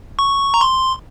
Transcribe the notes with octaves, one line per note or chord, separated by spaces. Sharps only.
C#6
A#5
C6